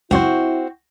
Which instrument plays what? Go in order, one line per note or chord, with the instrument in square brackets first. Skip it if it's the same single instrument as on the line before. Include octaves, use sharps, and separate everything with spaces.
[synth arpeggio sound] C#2 F#2 C5 [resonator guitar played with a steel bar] C4 F#4 [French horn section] E4